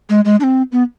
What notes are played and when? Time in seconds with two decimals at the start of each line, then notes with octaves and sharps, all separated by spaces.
0.10 G#3
0.25 G#3
0.40 D4
0.44 C4
0.72 B3